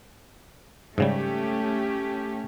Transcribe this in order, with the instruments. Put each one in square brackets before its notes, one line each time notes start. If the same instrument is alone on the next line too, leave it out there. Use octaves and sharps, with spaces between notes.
[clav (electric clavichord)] G#2 C#3 G3 [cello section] A3 C#4 G4